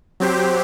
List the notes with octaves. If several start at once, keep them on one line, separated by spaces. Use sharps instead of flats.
F#3 C4 G4 C5